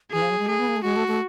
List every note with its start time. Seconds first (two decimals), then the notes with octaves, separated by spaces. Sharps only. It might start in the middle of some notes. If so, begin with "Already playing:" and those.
0.12 E3 G#4
0.22 F3
0.30 F#3
0.39 G#3
0.48 A3 G#4
0.59 B3
0.68 A#3
0.76 A3
0.83 G#3 F#4
0.96 A3
1.08 A3